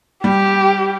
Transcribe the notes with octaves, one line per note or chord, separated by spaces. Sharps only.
G3 G4